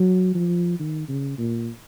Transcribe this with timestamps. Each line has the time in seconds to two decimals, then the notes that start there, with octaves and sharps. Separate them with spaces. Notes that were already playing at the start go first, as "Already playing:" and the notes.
Already playing: F#3
0.35 F3
0.79 D#3
1.09 C#3
1.38 A#2